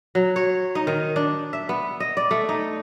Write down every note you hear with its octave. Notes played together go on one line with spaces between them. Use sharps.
F#3
C#5
D#4
D#3
D4
E5
B3
D#5
D5
A3
D#4